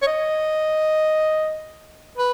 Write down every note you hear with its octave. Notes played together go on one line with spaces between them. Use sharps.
C#5
D#5
B4